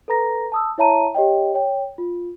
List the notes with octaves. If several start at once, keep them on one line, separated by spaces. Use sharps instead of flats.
A4 B4 A#5 A#6
A5 D#6 E6
E4 C#5 E5 A5 A#5 D#7
G4 C#5 D#5 G5
C#5 G5
F4